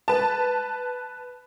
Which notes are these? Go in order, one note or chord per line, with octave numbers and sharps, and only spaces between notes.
B4 A5